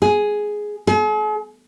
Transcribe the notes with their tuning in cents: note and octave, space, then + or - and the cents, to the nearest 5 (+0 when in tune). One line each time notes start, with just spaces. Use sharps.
G#4 +5
G#4 +45